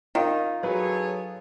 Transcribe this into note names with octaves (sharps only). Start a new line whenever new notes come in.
D#3 D#4 F4
F#3 G#4 A4 B4 C#5